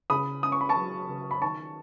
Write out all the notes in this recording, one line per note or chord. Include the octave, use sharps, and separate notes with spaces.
C#3 B5 D#6
C#4 D#6
C#6
B5
A5 C#6
F#3
C#3
B5
D#3 A5 C#6